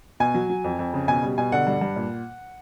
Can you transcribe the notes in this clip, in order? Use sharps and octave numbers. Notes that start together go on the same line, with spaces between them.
B2 G#5
F#3
F#3
F2
F2
C#3
B2 G#5
G3
B2 G#5
D3 F#5
G2
G2
A#2